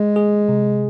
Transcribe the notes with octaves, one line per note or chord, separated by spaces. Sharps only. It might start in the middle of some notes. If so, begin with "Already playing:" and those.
Already playing: G#3 G#4
G#4
C3